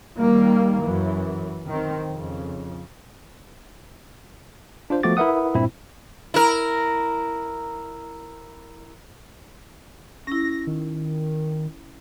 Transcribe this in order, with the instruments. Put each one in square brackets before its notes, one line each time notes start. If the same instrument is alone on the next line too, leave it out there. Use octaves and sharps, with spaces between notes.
[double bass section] D#3 G3 A#3
F#2 E3
D#3 C4
F2 C#3
[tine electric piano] D4 F4 C5
F3 A3 B3 F#4 D6 A6
E4 A#4 B4 E5 F#5 D#6
G2 A#2 C4 E4
[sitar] E4 A#4
[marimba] C#4 E4 [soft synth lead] A#6
[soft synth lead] D#3